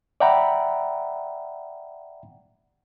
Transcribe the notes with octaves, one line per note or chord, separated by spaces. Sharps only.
D5 E5 F#5 G5 A#5 B5